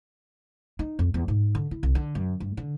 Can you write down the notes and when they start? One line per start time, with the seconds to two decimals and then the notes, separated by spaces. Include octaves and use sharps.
0.79 D#4
0.99 F2
1.14 E2
1.28 G#2
1.55 D3
1.71 E4
1.83 C2
1.95 D3
2.15 F#2
2.40 G2
2.57 D3